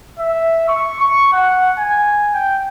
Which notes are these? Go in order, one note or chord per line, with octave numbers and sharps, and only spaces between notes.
E5
C#6
C#6
F#5
G#5
G5